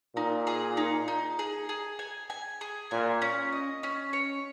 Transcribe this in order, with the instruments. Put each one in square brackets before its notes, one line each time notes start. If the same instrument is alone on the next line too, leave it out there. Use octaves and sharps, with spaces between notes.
[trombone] A#2 [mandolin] D#4
[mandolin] G#4
D#4
D#4
G#4
G#4
G#5
G#5
G#4
[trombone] A#2 [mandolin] G#5
[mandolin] C#4
D#5
C#4
C#5